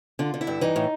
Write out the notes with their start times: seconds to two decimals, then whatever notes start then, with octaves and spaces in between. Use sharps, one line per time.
0.19 D3 F4
0.34 D3
0.41 E4
0.47 G2
0.61 E3 D#4
0.76 A2